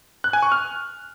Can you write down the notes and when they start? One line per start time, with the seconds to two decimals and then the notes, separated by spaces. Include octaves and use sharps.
0.24 F#6
0.33 G#5
0.43 C#6
0.52 F6